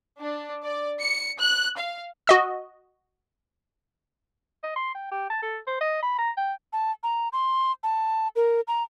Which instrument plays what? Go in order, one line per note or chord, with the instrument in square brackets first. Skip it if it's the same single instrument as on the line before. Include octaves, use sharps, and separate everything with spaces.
[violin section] D4
D5
C#7
F#6
F5
[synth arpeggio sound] F#4 D#5 E6
[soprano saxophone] D#5
C6
G5
G4
A5
A4
C5
D#5
B5
A#5
G5
[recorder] A5
A#5
C6
A5
A#4
A#5